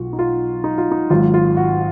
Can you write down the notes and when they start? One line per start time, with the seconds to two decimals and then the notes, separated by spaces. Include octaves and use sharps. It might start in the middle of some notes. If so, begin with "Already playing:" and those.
Already playing: B1 B2 F#3 F4 F#4
0.13 D#4
0.19 F4
0.64 D#4
0.78 F4
0.92 D#4
1.10 G#1 G#2 F#3 F4
1.34 F4
1.57 F#4